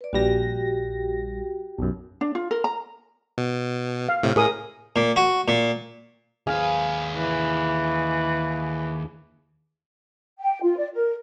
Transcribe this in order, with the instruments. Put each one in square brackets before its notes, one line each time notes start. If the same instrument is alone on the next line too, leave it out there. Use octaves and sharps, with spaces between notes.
[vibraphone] B4 D5
[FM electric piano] A#1 G3 A#6 [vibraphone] F#4 G4 G5
[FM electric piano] B1 F#2
[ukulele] D4
F4
A#4
A#5
[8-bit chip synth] B2
[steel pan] F5
[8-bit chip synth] A2 C3
[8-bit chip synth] A2 [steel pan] G#4 A#4 D#6
[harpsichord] A#2
F#4
A#2
[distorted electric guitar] D#2 B4 [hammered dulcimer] G#4 F5
[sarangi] E3
[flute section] G5
F4
D5
A#4